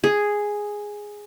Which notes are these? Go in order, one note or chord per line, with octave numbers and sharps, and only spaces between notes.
G#4